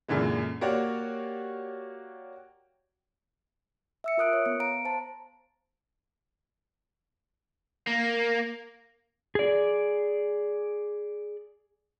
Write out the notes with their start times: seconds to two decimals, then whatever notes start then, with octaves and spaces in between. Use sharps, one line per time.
0.08 F#2 A#2 D3 E3 G#3
0.61 A#3 F#4 G4 C#5 D5
4.04 E5 E6 C#7
4.17 F4 A#4 D#6 F#6 D7
4.33 C#5
4.46 B3 C#7
4.60 F5 A#5 D7
4.85 C5 A5
7.87 A#3
9.35 G#4 D5